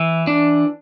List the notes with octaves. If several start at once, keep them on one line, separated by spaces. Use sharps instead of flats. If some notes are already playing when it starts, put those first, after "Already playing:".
Already playing: E3
D4